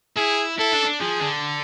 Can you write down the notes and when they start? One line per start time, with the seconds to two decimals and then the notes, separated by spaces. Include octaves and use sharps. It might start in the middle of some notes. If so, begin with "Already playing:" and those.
0.16 E4 G#4
0.59 E4 A4
0.73 D4
0.86 D4
1.00 F3 G#4
1.21 D3